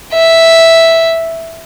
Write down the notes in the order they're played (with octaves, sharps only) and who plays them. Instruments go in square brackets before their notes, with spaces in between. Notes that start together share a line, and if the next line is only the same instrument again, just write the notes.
[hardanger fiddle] E5